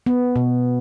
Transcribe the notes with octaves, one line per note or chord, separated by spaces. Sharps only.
B3
B2